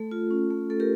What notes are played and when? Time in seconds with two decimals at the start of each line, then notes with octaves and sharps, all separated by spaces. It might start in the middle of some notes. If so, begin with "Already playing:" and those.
Already playing: A3 A4
0.11 F4
0.31 C#4
0.50 A3
0.70 A3 A4
0.80 G4 A#4